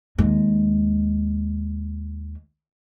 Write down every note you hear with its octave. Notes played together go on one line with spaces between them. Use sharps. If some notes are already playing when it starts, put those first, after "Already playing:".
D#2 G#3